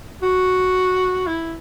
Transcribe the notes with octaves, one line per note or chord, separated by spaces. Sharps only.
F#4
E4